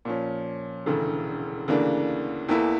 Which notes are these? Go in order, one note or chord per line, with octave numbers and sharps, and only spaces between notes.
A#2 F3 C#4
E1 D2 C#3 E3 A3
D2 C#3 E3 A#3 D4
E2 E3 A#3 E4 A4